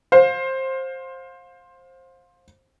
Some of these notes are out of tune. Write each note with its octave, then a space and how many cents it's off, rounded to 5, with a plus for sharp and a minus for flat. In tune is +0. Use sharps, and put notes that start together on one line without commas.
C5 +15 F5 +25